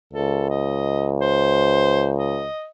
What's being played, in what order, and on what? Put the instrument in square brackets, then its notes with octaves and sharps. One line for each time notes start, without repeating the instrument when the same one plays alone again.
[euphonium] C#2 [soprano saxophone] A4
[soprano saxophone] D#5
C5
D#5